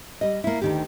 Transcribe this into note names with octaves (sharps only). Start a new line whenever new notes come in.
G3 D#5
A#3 E4
D2 D#3 G4